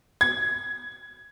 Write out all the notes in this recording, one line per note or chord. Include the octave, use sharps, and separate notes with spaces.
G#6